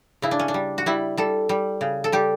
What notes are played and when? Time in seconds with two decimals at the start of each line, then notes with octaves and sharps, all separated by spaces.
0.22 C#3 E4
0.31 D4
0.39 C#4
0.48 D4
0.54 G3
0.78 F#4
0.86 G3 E4
1.17 G3 A4
1.49 G3
1.81 C#3
2.04 A4
2.12 G3 G4